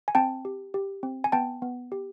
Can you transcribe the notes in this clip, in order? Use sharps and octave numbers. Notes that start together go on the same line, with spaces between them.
G#5
C4 G5 A5
G4
G4
C4
G#5
B3 G5 A5
B3
G4